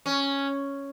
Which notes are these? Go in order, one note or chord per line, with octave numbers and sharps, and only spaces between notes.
C#4